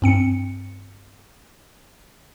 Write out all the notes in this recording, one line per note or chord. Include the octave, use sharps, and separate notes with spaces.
G2 C4 C#7